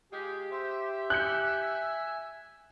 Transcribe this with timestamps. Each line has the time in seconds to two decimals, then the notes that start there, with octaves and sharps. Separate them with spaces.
0.13 G#3 F4 G4 G#4
0.51 C5 E5
1.10 G#5 F#6 G6 C#7